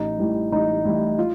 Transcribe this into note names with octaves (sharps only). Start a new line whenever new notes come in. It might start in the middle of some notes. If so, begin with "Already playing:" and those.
Already playing: A1 D#4
A2 E3 G3
A1 D#4
A2 E3 G3 E4
F4